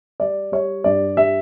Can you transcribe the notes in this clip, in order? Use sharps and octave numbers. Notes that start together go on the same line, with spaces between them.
G3 D5
G3 C#5
G2 D5
G3 E5